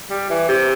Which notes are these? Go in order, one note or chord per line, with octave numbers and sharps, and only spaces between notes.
G3
E3
C3